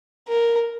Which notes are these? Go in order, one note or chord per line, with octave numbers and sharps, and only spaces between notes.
A#4